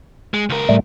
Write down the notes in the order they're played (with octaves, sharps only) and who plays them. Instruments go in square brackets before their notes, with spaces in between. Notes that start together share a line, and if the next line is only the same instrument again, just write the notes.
[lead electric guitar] G#3
C#2 A#4
[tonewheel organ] A2 G3 A3